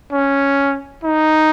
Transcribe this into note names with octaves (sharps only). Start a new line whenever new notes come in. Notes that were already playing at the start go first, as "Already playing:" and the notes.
C#4
D#4